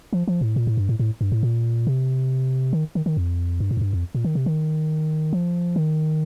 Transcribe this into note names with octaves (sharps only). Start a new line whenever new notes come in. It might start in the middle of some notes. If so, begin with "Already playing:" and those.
F3
F3
A2
A#2
A2
G2
A2
A2
G2
A2
A#2
C3
D#3
D#3
D#3
F2
G2
A2
F2
G2
F2
A#2
D#3
C3
D#3
F3
D#3